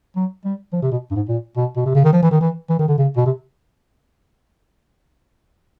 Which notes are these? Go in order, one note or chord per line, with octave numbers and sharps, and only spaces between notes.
F#3
G3
F3
C3
B2
G2
G#2
A#2
B2
B2
C3
C#3
D#3
F3
E3
D#3
E3
E3
D#3
D3
C#3
B2
C3